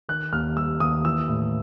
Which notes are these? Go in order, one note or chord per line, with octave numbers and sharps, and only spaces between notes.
D#3 F#6
D#2 F6
G3 E6
D#2 D#6
E3 E6
A2